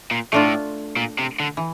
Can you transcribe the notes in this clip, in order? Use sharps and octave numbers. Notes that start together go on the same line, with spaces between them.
A#2
A2 A3 D4 F4
A#2
C3
D3
E3